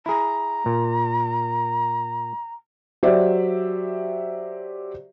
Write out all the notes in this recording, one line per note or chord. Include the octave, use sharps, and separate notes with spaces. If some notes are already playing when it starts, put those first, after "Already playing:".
E4 G#4 A#5
A#2
F#3 G4 C5 D5 E5